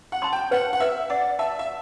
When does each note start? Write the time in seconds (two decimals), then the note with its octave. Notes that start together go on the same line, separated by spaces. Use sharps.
0.12 F#5
0.22 A5 C6
0.33 G5
0.51 B4 F#5
0.73 F#5
0.80 B4 E5
1.10 D5 F#5
1.39 E5 A5
1.59 E5